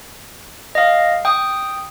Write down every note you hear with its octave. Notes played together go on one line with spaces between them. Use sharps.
D#5 F5
G5 D#6